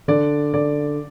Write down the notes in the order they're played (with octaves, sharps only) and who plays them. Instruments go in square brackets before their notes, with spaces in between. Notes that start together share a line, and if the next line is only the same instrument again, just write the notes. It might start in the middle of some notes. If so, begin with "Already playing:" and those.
[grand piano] D3 [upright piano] D5
[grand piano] D3 [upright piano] D5